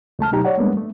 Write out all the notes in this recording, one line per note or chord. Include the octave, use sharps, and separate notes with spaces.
C#2 A3 A5 F6
B2 F#3 D#4 G4 A#5
C#5 D5 F#5
G3 G#3 A#3 B3 D4
A3